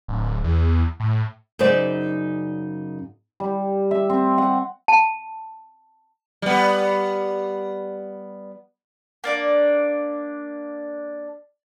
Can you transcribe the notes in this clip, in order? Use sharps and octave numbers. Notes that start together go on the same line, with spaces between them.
D1
E2
A2
F#2 C#3 D#4 C5 D5
G3
E5
C4
F#5
A5
G3 B3
A#3 D4 D5